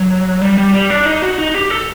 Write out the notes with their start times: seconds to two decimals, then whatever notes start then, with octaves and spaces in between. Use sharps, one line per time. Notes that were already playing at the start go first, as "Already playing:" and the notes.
Already playing: F#3
0.42 G3
0.58 G3
0.74 G3
0.90 D4
1.06 D#4
1.22 F#4
1.38 D#4
1.54 G4
1.70 A4